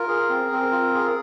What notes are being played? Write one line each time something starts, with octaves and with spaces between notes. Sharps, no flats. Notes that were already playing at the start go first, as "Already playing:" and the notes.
Already playing: F4 A#4
G#4
C4
C4
F4
G#4